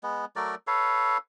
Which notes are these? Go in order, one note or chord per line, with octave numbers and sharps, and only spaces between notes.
G#3 B3
F#3 A3 A#4 D5
A4 B4 C#5 F5